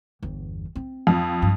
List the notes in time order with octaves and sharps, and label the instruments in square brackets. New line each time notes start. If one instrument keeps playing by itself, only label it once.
[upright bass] G1 E2
C4
[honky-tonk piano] F2
[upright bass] G2